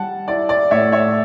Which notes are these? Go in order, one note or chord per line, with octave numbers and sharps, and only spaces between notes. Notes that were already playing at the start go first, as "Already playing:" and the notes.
Already playing: G3 F#5 A5
E4 D5
D5
A2 C#5 E5
C#5 E5